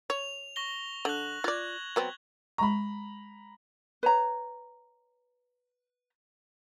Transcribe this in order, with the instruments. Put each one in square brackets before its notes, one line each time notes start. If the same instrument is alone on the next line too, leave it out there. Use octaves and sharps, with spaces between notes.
[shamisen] C#5 [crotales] F7
[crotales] C#6 A#6 G7
[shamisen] D3 [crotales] F#6 F#7
[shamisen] F4 D5 [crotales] F#6 G#6
[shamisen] F#3 B3 C4
[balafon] G#3 C#6 [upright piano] A#5 B5
[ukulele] B4 C#5 A#5